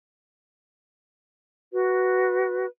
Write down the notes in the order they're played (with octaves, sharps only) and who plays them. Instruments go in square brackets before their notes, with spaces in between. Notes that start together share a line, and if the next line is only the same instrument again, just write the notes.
[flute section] F#4 B4